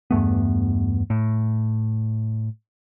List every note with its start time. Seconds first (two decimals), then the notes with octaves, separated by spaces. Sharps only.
0.11 E2 G2 A3 B3
1.10 A2